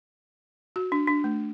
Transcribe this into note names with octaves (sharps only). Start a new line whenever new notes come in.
F#4
D4
D4
A3